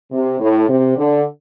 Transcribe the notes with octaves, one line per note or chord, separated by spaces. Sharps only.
C3
A2
C3
D3